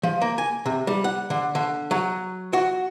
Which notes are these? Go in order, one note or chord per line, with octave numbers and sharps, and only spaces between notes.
F3
A#3
G#5
C3
G3
F#5
D3
D3
F#3
F#4